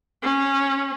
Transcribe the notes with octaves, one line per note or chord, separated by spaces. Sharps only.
C#4